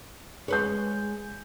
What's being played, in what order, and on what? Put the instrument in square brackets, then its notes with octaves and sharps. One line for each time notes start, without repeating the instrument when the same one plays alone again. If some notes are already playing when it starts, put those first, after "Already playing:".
[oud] G#3 B4 C#5 [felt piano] G#4 G6